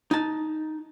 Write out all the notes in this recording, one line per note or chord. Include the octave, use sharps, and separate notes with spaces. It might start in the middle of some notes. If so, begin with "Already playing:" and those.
D#4 A5